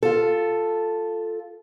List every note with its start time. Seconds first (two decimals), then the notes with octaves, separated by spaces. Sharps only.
0.03 F4 A4